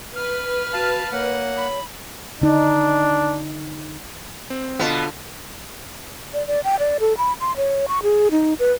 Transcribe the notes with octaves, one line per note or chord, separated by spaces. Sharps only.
B4 F6
F#4 F5 A5
A#3 C#5 F#5
B5
D3 D4 D#4
C4
B2 D3 B3 F4 A5
D5
D5
G5
D5
A4
B5
C6
C#5
C#6
G#4
D#4
B4